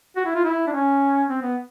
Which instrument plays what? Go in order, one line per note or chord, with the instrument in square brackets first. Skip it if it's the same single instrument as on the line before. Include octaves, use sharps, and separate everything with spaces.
[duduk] F#4
E4
F4
E4
D4
C#4
C4
B3